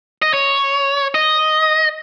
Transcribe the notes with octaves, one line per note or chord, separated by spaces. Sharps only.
D#5
C#5
D#5